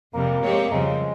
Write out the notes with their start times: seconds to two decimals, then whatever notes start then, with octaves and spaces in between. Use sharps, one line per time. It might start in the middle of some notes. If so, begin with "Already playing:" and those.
0.14 F2 C3 G3 A#3
0.43 G#3 C4 G4 C#5
0.72 F2 C#3 G3 G#3 C4